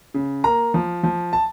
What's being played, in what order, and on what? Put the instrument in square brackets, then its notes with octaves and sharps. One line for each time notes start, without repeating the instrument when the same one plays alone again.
[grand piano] C#3
A#3 A#5
F3
F3
A5